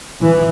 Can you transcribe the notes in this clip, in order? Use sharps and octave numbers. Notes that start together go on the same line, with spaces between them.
E3